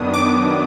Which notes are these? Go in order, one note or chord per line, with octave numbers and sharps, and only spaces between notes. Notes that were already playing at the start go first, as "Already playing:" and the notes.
Already playing: F#2 D#3 F#3 B3 D4 D#6
D6